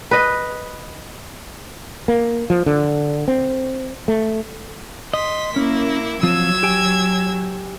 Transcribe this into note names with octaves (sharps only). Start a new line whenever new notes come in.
B4 D#5
A#3
F3
D3
C4
A3
D#5 C6 B6
A#3 C#4 E4
F3 F#3 C4 F4 E6 G#6
G4 G5 G#5